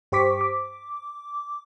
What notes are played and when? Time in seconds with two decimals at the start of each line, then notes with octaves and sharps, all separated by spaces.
0.12 G2 G4 C5 C#6 D6 B6
0.41 D6